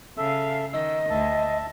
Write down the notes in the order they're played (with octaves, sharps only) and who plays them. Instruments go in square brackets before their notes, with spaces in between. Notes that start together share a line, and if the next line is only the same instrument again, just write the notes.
[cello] C#3 F5 [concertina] A4 E5
[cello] D#3 [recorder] D#5 [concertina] E6
[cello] D2 [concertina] E5 A5